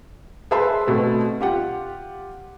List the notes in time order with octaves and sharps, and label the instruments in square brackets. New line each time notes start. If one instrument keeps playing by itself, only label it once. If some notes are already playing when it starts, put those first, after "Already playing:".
[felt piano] G#4 B4 C5 E5 A5 C6
B2 A3 C4
F4 G4 F#5